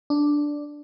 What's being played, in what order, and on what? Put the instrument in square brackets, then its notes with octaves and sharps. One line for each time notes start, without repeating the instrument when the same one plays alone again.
[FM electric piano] D4